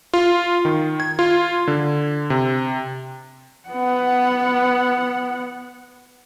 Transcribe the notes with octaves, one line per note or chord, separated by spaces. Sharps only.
F4
D#3
G#6
F4
D3
C3
B3 F#5